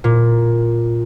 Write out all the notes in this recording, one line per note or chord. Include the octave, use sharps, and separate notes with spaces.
A#2